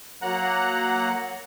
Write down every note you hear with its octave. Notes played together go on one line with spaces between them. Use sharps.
F#3 A#3 F#5 A#5 F#6